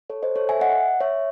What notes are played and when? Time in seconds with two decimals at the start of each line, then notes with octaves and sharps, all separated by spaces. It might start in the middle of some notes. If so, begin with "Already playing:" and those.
0.10 A4 C#5
0.23 C5 D#5
0.36 A4 C#5
0.49 E5 G#5
0.61 D#5 F#5
1.00 C#5 E5